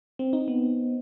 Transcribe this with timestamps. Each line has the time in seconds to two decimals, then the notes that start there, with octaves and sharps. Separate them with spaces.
0.19 C4
0.33 D#4
0.48 B3